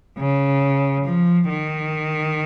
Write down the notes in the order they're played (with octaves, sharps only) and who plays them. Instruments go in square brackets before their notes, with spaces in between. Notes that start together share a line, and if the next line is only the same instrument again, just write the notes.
[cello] C#3
F3
D#3